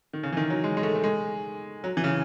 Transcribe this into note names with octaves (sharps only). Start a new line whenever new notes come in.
D#3
C#3
E3
D#3
F#3
G#3
G#3
A3
A3
G#3
F#3
E3
C#3